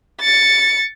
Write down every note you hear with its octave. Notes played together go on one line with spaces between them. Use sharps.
A6 C#7